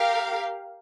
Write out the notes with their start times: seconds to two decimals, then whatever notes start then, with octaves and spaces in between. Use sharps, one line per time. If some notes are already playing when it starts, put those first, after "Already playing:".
Already playing: G4 A#4 F5